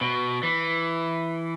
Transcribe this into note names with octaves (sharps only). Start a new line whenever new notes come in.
B2
E3